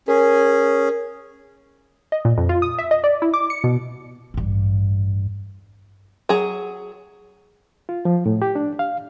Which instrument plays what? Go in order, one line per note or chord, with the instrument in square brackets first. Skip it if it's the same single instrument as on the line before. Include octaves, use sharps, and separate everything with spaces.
[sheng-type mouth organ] C#4 G#4 [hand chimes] A#4
[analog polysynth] D#5
A#2
F2
F4
D#6
E5
D#5
D5
E4
D6
C#7
B2
[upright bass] A1 G2
[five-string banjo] F#3 G#4
[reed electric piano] F4
F3
A2
G4
D4
F5